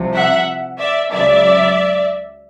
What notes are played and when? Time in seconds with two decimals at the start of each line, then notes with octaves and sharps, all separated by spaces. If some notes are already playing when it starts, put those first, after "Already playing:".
Already playing: C2 C3 F3
0.15 E5 F#5
0.79 D5 E5
1.11 C#2 C#3 F#3 D5 E5